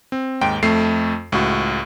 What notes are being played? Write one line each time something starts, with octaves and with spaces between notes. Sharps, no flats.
C4
D#2 G#2 G5 D7
F2 A3 C7
C#2 A2 F#4